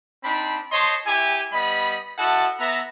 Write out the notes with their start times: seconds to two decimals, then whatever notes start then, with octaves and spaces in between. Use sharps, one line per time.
0.24 C4 D4 D#4 B5
0.72 C5 C#5 D#5 A5 C6
1.07 E4 G4 G#5
1.52 G3 B3 D#5 B5
2.18 E4 F#4 A4 D#5 F#5 A5
2.60 B3 E5 A#5